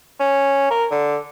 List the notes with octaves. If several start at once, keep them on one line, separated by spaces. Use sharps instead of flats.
C#4
A#4
D3